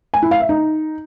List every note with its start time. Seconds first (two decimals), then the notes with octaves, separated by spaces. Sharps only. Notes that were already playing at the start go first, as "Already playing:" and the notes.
0.14 G#5
0.22 E4
0.31 F5
0.40 E5
0.49 D#4